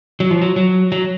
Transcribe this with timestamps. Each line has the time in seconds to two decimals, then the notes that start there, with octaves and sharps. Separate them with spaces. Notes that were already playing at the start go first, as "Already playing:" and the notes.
0.20 F#3
0.31 F3
0.42 F#3
0.56 F#3
0.92 F#3